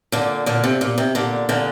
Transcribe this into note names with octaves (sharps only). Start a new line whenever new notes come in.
A#2 D3
A#2 D3
C3
A#2
C3
A#2 D3
A#2 D3